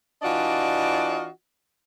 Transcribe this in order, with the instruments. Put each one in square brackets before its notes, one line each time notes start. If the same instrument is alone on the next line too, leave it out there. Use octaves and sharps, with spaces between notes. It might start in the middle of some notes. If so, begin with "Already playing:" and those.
[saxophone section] E3 D4 F4 F#4 D5 D#5